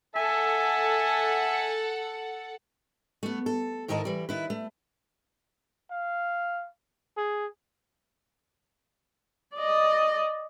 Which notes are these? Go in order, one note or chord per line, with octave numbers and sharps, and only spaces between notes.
A4 E5 F#5 G#5
A3 B3
A4
G#2 D#3 E4 A#4 D#5 A5
E3 G3
D#3 E4 B4
A3
F5
G#4
D5 D#5